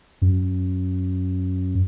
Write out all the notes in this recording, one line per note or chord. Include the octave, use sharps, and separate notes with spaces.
F#2